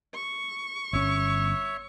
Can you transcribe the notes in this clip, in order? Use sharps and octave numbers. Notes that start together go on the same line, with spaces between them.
C#6
G1 C#4 C#5 E5